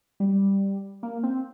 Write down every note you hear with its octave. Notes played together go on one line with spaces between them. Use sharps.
G3
A#3
C4